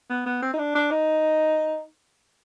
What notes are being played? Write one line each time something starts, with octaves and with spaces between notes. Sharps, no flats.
B3
B3
C4
D#4
D4
D4
D#4